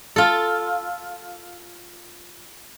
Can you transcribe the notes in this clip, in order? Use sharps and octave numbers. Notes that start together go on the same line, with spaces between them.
F4 A4